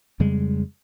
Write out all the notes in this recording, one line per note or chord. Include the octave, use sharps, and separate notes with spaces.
F2 C#3 G3 G#3